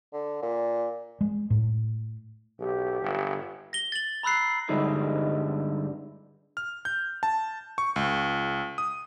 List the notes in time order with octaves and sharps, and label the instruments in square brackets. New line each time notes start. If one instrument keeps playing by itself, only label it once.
[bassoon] D3
A#2
[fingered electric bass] G#3
A2
[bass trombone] B1 [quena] G4
[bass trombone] G1
[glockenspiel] A#6 G7
A6 F#7
A#5 B5 E6 F#6 C7
[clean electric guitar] G2 D3 G3 G#3 D#4 E4
[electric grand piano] F6
G6
A5
C#6
C#2
D#6